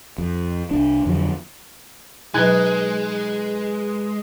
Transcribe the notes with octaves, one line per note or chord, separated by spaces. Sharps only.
F2
C2 D4
F2 D3 F3 F#3
B2 F#3 G#3 D#4 B4 G#5 F#6 G#6